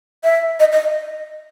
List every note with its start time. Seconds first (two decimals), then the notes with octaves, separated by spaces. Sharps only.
0.24 E5
0.60 D#5
0.72 D#5